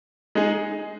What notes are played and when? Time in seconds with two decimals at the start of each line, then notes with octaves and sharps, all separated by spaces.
0.35 G#3 D#4 G#4